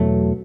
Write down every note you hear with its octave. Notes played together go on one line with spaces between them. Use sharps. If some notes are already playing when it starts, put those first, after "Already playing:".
Already playing: E2 B2 F#3 A3